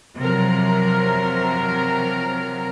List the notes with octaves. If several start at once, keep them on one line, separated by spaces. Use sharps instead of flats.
C3 F3 F#3 A#4